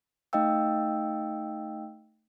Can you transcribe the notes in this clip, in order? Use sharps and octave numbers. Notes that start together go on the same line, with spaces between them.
A3 D#4 D#5 F5 G5 E6